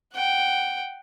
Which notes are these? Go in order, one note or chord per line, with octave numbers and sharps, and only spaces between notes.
F#5 G5